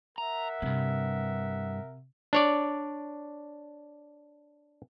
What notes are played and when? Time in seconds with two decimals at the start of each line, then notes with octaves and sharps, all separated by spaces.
0.18 A#4 E5 F#5 A#5
0.62 D2 G2 C3
2.33 D4 C#5 D5